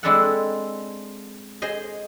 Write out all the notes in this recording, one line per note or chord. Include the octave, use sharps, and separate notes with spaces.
G#3 C4 D4 E4 A4 F#5
G#4 C5 D#5